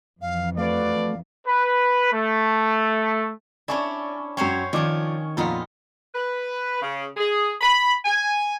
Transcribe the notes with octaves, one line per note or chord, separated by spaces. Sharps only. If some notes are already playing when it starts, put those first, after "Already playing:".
F2 E3 F5
A3 F#4 B4 D5 F5
B4
A3
C#4 D4 E4 D5 G#5 C#6
F#2 C#4 C5 C#5 G5
D#3 F3 C#4 D5 D6
F2 A#2 B3 D#4 F4
B4
C#3
G#4
B5
G#5